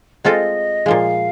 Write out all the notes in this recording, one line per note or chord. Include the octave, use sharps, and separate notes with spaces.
G#3 C4 F4 A4 D#5
A#2 F3 G#3 F5